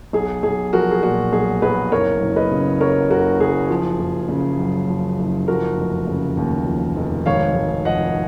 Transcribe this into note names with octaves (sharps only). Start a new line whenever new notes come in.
B1 G#4
B1 G#4
F3 F#4 A#4
G#4
A#2 F#4
B1 G#4
B1 G#4 B4
F#1 A#4 C#5
F#1
B4 D#5
C#3
F#2 A#4 C#5
F#1 F#4 A#4
F#1 G#4
F3
F#1
C#3
F#2
F3
F#1
F3 F#4 A#4
F1
C#3
D#2
F3
F1
G#1 C#5 F5
G#1
F3 D#5 F#5